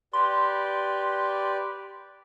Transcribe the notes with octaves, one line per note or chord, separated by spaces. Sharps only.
G4 B4 D5 C6